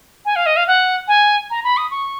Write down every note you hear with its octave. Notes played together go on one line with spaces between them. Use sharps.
G#5
F5
D#5
F5
F#5
G#5
A#5
B5
D#6
C#6